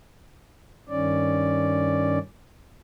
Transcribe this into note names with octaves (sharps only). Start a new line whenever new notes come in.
G2 D#3 C#4 D5